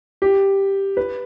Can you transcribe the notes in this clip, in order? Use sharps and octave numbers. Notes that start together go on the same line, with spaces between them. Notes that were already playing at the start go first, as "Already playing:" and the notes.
G4
B4